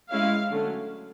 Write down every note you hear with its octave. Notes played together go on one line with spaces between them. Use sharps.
G#3 C#4 E4 F5
D3 F#3 A3 C#4